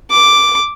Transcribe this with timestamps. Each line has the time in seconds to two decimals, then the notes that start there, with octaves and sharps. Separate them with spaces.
0.10 D6